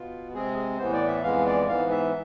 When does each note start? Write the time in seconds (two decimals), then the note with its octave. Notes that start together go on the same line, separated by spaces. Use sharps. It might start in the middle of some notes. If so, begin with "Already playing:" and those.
Already playing: B2 B3 F4
0.34 C3 G#3 C4 G#4
0.78 A2 E3 B3 C5
0.93 D5
1.08 E5
1.22 F2 E3 G#3 B3 F5
1.46 D5
1.68 G#2 E3 B3 F5
1.91 E5